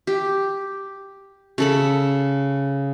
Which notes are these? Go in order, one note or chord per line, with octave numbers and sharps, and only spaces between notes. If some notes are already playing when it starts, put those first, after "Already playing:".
G4
C#3 A4 B5